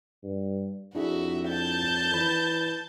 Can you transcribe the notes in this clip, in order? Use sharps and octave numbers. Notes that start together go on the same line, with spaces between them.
G2
F2 D4 E4 F#4 G#4 E5
A5 G6
E3 B5